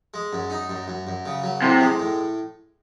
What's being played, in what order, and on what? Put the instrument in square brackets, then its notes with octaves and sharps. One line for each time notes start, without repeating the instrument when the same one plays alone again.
[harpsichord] G#3
F#2
D#4
F#2
F#2
F#2
C#3
F#3
[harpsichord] A2 [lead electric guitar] C3
[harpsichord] G#3
A2